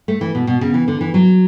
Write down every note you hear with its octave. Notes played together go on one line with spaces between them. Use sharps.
A3
E3
B2
B2
C#3
E3
D3
E3
F#3